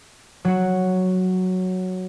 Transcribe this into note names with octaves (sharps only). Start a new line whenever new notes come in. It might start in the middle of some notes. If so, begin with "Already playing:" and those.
F#3 F#4